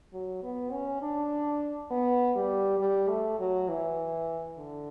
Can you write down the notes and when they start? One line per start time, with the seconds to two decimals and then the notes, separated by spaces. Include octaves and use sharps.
0.13 F#3
0.43 B3
0.72 C#4
1.02 D4
1.91 B3
2.35 G3
2.79 G3
3.08 A3
3.39 F#3
3.69 E3
4.57 D3